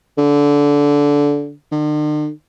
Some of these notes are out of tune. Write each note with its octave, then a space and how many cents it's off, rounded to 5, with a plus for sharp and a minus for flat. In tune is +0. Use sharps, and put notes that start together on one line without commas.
D3 -20
D3 +45